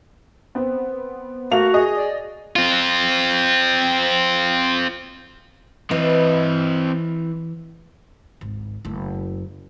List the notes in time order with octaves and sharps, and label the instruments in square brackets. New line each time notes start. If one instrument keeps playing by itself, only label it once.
[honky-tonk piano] B3 C4
[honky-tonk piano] A3 F5 F7 [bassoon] A#3 [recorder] F#4
[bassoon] G#4 [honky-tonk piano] D#5
[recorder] D5
[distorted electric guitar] C4 F4
[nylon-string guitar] E3 [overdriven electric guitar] C4 D#5
[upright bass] G#1 C#2
F#1 A3